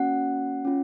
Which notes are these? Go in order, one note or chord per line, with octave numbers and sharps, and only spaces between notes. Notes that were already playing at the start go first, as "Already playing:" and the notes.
Already playing: A#3 C#4 F#4 F#5
C#4 F4